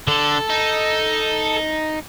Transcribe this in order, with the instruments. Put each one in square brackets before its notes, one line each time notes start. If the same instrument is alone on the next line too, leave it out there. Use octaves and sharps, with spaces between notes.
[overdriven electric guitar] D3 [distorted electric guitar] A4
[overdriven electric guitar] D#4